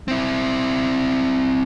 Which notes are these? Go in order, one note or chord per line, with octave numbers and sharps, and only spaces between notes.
C4 E4